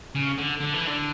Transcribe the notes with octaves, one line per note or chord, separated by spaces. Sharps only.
C#3
D3
D3
E3
D3